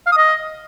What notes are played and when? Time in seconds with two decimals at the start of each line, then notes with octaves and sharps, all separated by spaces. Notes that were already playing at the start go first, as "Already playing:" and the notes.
0.06 F5
0.12 D#6
0.17 D#5